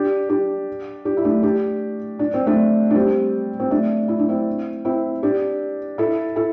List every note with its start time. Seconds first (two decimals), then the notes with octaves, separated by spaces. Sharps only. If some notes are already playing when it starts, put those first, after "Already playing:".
Already playing: D4 G4
0.29 D4 G4
1.05 D4 G4
1.17 E4
1.25 A3 D4
1.43 D4 G4
2.19 D4
2.34 C4
2.46 A3 D4
2.90 D4
2.95 G3 C4
3.60 C4
3.71 A3 D4
4.08 E4
4.19 D4
4.29 C4 E4
4.85 C4 E4
5.23 D4 G4
5.98 E4 A4
6.36 E4 A4